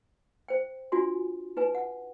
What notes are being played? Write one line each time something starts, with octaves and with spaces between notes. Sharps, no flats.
C5 G5
D4 F4 F#4 G#5 C6
D#4 B4 G#5
F#5